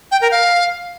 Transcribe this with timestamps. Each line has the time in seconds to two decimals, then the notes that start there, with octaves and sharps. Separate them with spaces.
0.11 G5
0.21 A#4
0.31 F5